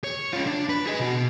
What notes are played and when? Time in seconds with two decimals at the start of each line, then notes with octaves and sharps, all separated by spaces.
0.04 C#5
0.33 C#4 F4
0.47 D4
0.69 B4
0.87 G#4 D#5
1.00 B2 F#4